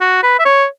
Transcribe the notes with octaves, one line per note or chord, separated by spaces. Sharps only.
F#4
B4
E5
C#5